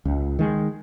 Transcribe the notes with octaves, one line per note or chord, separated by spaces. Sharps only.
C#2
D#3 G#3